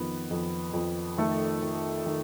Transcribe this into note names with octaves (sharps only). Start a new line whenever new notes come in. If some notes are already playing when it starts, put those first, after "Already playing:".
Already playing: F2 D#3 B3
F2
F2
D#3 A3 A4
D#3
D#3